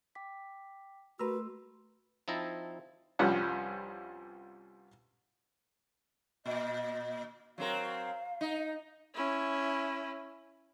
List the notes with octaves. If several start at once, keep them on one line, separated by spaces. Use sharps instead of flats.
G5 D6 B6
A3 F#4 A#4 B4 C6 E6
F3 C4 D#4 E4 A5 A#5
C2 G2 F3 G3 C#4 F#5
A#2 D#5
F#3 C4 A#4 F5
D#4
C#4 E4